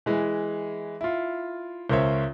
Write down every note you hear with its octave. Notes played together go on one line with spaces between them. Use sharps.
E3 G#3 E4
E4 F4
C#2 A#4 C5 C#5 E5